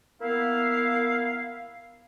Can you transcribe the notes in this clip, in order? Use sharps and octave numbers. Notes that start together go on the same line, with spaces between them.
A#3 B3 E4 F5